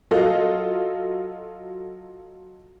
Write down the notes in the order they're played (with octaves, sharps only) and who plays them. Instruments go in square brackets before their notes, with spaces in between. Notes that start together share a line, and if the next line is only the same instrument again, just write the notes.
[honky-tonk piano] F#3 F4 A4 D#5 F5